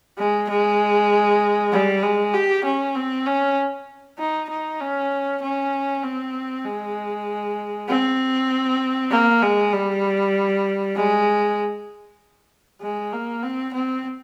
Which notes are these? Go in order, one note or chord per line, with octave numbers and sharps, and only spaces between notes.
G#3
G#3
G3
G#3
G4
C#4
C4
C#4
D#4
D#4
C#4
C#4
C4
G#3
C4
A#3
G#3
G3
G#3
G#3
A#3
C4
C4